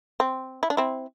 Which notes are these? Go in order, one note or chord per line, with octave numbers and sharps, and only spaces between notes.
C4
E4
D4
C4 E4